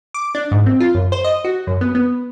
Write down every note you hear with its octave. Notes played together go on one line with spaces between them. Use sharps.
D6
D4
G#2
C4
F4
F#2
C5
D#5
F#4
F#2
B3
B3